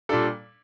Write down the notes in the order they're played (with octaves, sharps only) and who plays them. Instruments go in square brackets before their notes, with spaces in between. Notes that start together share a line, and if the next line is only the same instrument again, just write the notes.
[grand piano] A#2 G3 D4 A4